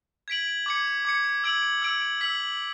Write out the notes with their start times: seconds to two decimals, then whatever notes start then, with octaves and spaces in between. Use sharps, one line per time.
0.28 G#6 B6 D7 F#7
0.66 D6 G#6 C#7
1.05 D6 G#6 C#7
1.44 E6 G#6 D7 F#7
1.82 E6 G#6 D7 F#7
2.21 E6 B6 F#7